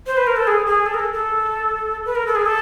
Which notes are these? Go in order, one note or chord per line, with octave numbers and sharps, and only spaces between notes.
C5
B4
A#4
A4
G#4
G#4
A4
A#4
A4
A4
B4
A#4
A4
G#4
A4